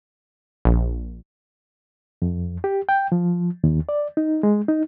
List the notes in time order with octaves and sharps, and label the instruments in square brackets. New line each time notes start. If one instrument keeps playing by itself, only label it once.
[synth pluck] A#1
[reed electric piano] F2
G4
G5
F3
D#2
D5
D#4
G#3
D#4